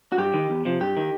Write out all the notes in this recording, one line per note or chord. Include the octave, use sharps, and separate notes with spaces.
F#4
G2 G4
D#3
E2
C3 F3
G2 G4
D#3